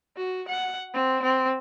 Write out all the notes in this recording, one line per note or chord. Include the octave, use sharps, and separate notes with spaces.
F#4
F#5
C4
C4